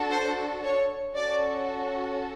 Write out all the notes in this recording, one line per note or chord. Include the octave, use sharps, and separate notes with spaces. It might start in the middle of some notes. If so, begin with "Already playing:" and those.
Already playing: D4 F#4 A4
C5
C#5
C#4 F#4 A4 D5